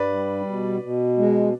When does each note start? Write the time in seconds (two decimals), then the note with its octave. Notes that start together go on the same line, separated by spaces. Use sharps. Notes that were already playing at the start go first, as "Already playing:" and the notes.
Already playing: G2 B4 D5
0.11 G3
0.46 B2
0.83 B2
1.18 G#3